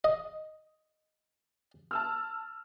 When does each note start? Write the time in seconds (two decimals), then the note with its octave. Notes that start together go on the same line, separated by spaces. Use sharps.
0.04 D#5
1.91 A5 E6 F6